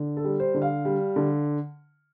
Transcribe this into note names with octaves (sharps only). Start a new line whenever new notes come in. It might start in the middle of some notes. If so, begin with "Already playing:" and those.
Already playing: D3
A4
G3
C5
D3
F5
G3
D3